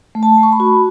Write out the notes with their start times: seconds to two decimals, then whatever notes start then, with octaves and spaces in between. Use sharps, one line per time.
0.15 A3
0.23 A5
0.38 A3
0.43 C#6
0.52 B5
0.60 F#4